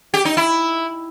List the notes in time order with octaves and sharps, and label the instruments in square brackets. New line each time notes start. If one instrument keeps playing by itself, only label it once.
[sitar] G4
D#4
E4